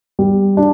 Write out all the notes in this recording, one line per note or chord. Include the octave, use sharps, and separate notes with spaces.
G3
D4 G4